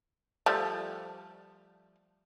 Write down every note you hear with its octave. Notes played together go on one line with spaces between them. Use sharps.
F3 G3 A3